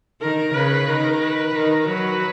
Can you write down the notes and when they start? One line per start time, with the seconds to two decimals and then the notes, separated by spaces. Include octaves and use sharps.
0.22 D#3 A#4
0.55 C#3 B4
0.88 D#3 A#4
1.22 B4
1.55 D#3 A#4
1.88 F#3 B4